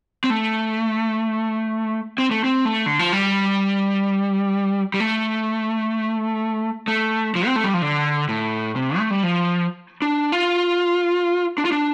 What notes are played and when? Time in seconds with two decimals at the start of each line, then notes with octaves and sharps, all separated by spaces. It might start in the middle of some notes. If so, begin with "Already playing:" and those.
0.24 C4
0.30 A3
2.18 C4
2.31 A3
2.44 C4
2.65 A3
2.86 D3
2.99 F3
3.12 G3
4.94 G3
5.00 A3
6.88 A3
7.35 F3
7.47 C4
7.56 A3
7.64 G3
7.74 F3
7.82 D3
8.29 A2
8.76 C3
8.98 A3
9.11 G3
9.23 F3
10.02 D4
10.32 F4
11.58 D4
11.65 F4
11.72 D4